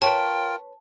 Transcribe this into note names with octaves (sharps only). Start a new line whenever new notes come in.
F4 A#4 B4 C#5 G5 A5